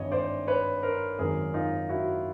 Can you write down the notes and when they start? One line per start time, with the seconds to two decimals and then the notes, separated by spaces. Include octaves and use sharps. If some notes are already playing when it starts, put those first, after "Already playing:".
Already playing: G#1 G2 E3 C#5 D#5
0.12 C5 D5
0.47 B4 C#5
0.83 A#4 C5
1.18 G#1 F#2 D#3 G#4 A#4
1.54 D#4 F4
1.89 E4 F#4